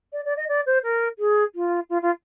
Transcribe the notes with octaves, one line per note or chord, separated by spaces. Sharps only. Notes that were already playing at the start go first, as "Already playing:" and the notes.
D5
D5
D#5
D5
C5
A#4
G#4
F4
F4
F4